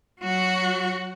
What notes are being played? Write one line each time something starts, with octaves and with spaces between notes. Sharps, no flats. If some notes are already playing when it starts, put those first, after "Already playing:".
F#3 F#4